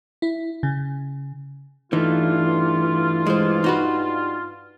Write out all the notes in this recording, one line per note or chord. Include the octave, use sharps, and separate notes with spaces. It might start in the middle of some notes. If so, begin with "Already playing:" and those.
E4
C#3
G2 E3 A3 D#4 F4
G#3 C5
D#4 F#4 B4